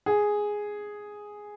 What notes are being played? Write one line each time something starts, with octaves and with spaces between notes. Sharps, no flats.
G#4